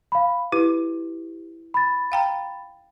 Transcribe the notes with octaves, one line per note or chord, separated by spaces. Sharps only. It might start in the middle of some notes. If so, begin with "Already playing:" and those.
F5 B5
E4 G4 B4
B5 A6
F5 G5 A#5